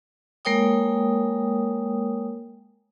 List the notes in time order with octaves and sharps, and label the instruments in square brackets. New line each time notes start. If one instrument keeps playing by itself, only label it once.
[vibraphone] G#3 A#3 A#4 C#5 G5 D#6